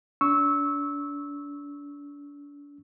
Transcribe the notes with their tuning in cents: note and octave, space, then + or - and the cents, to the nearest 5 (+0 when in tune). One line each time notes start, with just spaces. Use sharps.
D4 -35 C#6 +0 E6 -15